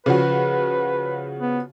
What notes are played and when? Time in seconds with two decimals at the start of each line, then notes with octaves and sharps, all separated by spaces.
0.06 C#3 F3 F#4 B4
1.38 B3